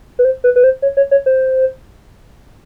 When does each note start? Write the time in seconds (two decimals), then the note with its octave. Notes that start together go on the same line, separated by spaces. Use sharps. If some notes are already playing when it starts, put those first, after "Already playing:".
0.19 B4
0.25 C5
0.44 B4
0.56 B4
0.64 C5
0.82 C#5
0.97 C#5
1.11 C#5
1.26 C5